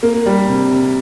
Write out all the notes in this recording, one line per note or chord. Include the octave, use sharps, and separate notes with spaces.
A#3
G3
C3
C3